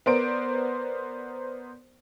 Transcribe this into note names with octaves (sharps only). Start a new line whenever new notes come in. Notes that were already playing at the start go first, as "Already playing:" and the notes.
B3 A#4 C5 D5 D7